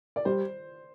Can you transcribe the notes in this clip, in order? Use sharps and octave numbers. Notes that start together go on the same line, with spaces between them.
D5
G3 C5